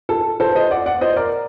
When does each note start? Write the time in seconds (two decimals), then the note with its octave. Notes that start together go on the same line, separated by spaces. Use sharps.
0.09 A4
0.40 A4 C5
0.55 C5 D#5
0.71 D5 F#5
0.86 D5 F#5
1.01 C5 D#5
1.16 A#4 D5